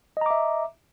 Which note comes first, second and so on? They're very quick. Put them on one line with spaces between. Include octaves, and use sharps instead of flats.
D#5 A#5 D6 E5